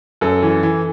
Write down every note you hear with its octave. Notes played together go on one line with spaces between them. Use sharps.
F#2 A4
E3
E3